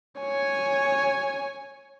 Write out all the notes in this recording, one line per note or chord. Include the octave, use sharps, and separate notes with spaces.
C#5 G#5